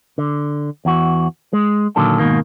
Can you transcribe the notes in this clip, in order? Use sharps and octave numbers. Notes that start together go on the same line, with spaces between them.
D3
E2 E3 F#4
G#3
A#2 D3 D#3 F#3 A4
G#2 B2 D#3 A#3